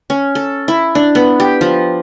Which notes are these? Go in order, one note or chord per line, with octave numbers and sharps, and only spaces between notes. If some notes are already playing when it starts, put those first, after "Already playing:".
C#4
A4
E4
D4
B3
G4
F3